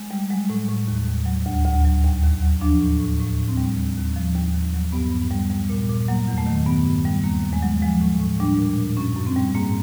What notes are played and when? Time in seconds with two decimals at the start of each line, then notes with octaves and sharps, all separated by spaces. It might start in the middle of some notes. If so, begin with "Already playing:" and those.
Already playing: G#3
0.11 G3
0.30 F#3 G#3
0.50 A2
0.68 A2
0.88 D#2
1.07 D#2
1.26 F#3
1.46 D2
1.65 D2
1.85 F#3
2.04 D#2
2.23 D#2
2.42 F#3
2.61 F3 D4
2.81 A2
3.00 A2
3.20 A2
3.39 A2
3.48 C4
3.57 G3
3.77 D#2
3.97 D#2
4.16 F3
4.34 D#2
4.54 D#2
4.74 F#3
4.92 G2 B3
5.12 G2
5.31 G3
5.50 G3
5.70 A#2
5.89 A#2
6.08 F#3 A#3
6.28 E2
6.38 A3
6.46 D#3
6.66 G2 B3
6.86 G2
7.05 G3
7.24 D#2 A#3
7.43 D#2
7.53 G#3
7.62 F#3
7.82 F3 G#3
8.01 A2
8.20 A2
8.40 G3 D4
8.58 A#2
8.78 A#2
8.97 F#2 C#4
9.17 F#2
9.27 C4
9.36 G3
9.55 G#2 A#3